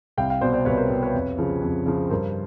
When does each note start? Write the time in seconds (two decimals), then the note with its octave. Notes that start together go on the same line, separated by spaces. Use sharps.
0.17 C2 F5 G5
0.30 F5 G5
0.41 B2 C5 D5
0.53 C5 D5
0.65 C2 B4 C#5
0.77 A#4 C5
0.90 B2 B4
1.03 B4 C#5
1.14 F2
1.38 C#3 F3
1.62 F2
1.86 C#3 F3
2.10 G2 A#4 C5